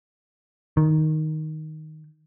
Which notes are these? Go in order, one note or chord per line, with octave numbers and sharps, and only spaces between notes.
D#3